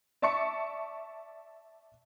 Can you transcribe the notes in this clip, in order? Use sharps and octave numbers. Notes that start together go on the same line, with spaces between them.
D5 E5 A5 C#6 D6 C#7